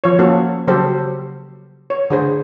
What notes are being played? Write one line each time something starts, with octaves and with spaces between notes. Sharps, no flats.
F3 C#5
A#3 C#4 F#4 A4 C5
C#3 F#3 G4 A4 C5
C#5
D3 G#4 C5